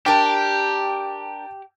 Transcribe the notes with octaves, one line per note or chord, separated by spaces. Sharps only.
D4 G4 A#4 G5 A5